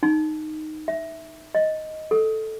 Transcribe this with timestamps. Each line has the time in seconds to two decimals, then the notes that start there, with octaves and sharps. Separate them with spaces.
0.03 D#4
0.88 E5
1.55 D#5
2.11 A4